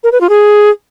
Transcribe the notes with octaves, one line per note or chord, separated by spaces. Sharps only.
A#4
B4
F4
G#4